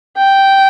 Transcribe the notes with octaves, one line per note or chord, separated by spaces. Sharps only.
G5